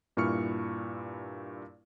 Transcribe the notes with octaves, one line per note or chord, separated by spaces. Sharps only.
G2 A#2 E4 C#6 F6 C#7